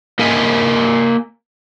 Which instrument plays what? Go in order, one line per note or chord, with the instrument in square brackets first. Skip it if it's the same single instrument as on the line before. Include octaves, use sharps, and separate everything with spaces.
[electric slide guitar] A#3 A#4 D#5 E5 G#5